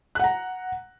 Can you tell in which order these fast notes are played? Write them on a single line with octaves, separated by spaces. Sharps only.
F#6 F#5 A#5